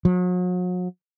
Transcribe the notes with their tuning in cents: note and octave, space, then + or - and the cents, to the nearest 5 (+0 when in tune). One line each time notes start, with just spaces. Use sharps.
F#3 -40